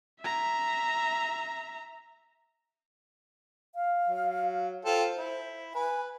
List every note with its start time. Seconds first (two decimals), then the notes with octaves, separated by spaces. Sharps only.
0.20 E5 A#5
3.75 F5
4.08 F#3
4.85 F4 A4 C5 G5
5.17 E4
5.75 B4 G#5